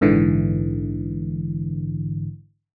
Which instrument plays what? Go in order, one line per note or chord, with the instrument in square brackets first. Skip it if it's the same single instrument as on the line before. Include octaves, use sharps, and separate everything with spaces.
[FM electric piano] A#1 G#2 D3 E3